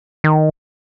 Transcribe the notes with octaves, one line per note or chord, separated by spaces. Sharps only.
D#3